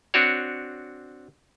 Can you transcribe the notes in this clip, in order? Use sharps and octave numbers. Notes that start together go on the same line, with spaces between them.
C4 D4 F#4 C#5